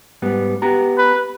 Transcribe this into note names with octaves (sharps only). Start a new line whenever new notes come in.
G#2 G3 B3
B3 G4 A#5
B4